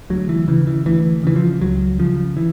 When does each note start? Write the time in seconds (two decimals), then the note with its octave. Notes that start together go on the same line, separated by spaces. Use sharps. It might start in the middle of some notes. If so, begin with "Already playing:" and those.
0.10 D2 F#3
0.29 E3
0.48 C#3 E3
0.67 E3
0.85 D2 E3
1.24 C#3 E3
1.36 F3
1.61 C#2 F#3
1.99 C#3 F3
2.37 E3